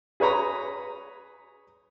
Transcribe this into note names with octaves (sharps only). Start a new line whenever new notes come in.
G#4 B4 C#5 A#5 B5